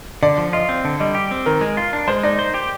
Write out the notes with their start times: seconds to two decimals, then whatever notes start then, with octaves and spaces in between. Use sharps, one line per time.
0.23 D3 D5
0.38 F3
0.53 F4 D#5
0.69 C4
0.85 D3
1.00 G3 D#5
1.15 G4
1.31 C4
1.46 D#3 A#4
1.61 G#3
1.77 F4
1.93 D4
2.08 G#3 C5
2.23 D#4 D5
2.39 C5
2.54 G4